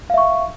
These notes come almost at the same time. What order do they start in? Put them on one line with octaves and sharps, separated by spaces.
F5 E5 C#6